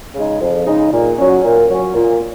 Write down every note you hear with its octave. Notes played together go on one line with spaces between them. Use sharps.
C#3 G#3 D#4
F2
C#3 G#3 D#4
A#2
F#3 C#4
A#2
F#3 C#4
A#2